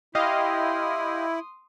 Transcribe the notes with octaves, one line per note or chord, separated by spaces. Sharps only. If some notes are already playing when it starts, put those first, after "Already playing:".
E4 G4 D#5 F5 C6 D#6